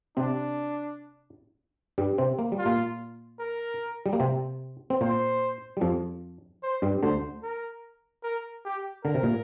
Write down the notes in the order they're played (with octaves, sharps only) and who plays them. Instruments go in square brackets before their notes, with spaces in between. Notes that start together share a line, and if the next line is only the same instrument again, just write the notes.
[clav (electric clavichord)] C3 C4 [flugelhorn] D4
[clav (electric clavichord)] G2 G3
C3 C4
A#3
G3
[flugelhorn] F4
[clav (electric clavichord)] A#2 A#3
[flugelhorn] A#4
[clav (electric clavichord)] G3
A#3
C3 C4
C4
[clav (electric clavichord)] A#2 A#3 [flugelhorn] C5
[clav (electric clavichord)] G3
F2 F3
[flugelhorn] C5
[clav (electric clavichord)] G2 G3
[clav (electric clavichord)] D2 D3 [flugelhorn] C5
[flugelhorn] A#4
A#4
G4
[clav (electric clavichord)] D3 [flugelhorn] A#4
[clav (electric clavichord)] C3
A#2